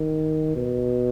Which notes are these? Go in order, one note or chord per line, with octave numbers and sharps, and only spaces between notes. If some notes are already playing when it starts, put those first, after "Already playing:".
Already playing: D#3
B2